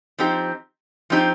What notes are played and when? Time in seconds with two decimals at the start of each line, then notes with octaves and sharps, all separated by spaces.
0.18 F3 C4 D#4 G4
1.10 F3 C4 D#4 G4